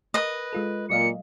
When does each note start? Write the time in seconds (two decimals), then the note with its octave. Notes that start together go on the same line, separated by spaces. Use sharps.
0.14 A#4 B4 D#5
0.53 G#3 F4 A4
0.90 A#2 F#3 D#5 F5 C#7